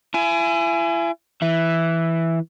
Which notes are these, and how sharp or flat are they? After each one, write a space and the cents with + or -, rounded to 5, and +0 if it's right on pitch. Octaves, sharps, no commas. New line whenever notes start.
E4 +40 G#5 +10
E3 +0 E5 +0